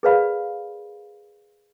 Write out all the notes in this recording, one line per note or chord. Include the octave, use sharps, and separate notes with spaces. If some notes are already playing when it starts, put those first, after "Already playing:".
G#4 A#4 B4 D5 F5 B5